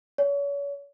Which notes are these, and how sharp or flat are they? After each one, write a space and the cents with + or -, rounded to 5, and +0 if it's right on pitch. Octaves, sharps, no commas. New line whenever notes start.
C#5 +35